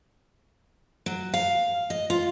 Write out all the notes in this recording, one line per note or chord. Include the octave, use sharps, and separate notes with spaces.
F#3
F5
D#5
F4